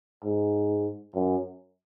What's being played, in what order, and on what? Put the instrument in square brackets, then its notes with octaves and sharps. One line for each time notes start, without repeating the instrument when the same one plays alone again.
[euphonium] G#2
F#2